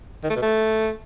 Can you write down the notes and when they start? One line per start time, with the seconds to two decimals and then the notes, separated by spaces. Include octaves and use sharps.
0.24 D#3
0.30 A3
0.36 B2
0.42 A3